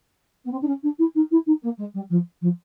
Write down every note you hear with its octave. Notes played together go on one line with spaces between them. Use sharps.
B3
C4
D4
C#4
D4
E4
D#4
E4
D#4
A#3
G#3
G3
F3
F3